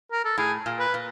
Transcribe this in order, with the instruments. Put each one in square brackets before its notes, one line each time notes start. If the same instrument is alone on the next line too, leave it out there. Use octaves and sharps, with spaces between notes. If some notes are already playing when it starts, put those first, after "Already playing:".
[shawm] A#4
A4
[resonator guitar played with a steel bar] A2 [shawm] G#4
[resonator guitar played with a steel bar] A#2
[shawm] B4
[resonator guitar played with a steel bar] A#2